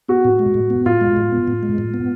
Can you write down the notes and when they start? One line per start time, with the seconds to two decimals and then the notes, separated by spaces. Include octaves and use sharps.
0.09 B3 F#4
0.25 A2
0.39 G#3
0.54 A2
0.70 B3
0.86 A2 F4
1.01 G#3
1.17 A2
1.32 B3
1.48 A2
1.63 G#3
1.78 A2
1.94 B3